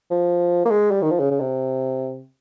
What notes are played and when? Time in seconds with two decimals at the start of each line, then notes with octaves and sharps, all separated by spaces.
0.11 F3
0.65 A#3
0.71 G#3
0.91 G3
1.02 D#3
1.11 F3
1.20 C#3
1.31 C#3
1.40 C3